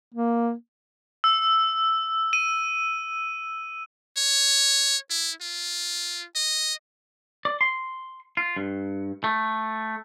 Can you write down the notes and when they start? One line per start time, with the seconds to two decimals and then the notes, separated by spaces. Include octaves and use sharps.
0.14 A#3
1.24 E6
2.33 D#7
4.17 C#5
5.10 E4
5.41 F4
6.36 D#5
7.45 D5
7.61 C6
8.37 F4
8.57 G2
9.24 A3